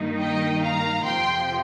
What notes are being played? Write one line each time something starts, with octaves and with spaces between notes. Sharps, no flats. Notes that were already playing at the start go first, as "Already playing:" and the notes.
Already playing: G2 D#3 A#3 D#4
D#5 G5
F5 A#5
F2 C3 F3 G5 C6